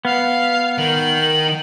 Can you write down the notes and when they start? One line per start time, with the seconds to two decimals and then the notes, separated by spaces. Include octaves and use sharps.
0.05 B3 F5
0.78 D#3 F#7